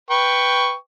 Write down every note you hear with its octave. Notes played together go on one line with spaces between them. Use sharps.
B4 G5 C#6